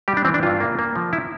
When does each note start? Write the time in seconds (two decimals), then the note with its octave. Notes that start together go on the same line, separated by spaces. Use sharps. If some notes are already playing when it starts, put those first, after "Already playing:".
0.08 G3 G4
0.17 D4
0.25 E3 C4
0.34 D4
0.43 G2 F4
0.60 A#3
0.79 A#3
0.96 F3
1.13 E4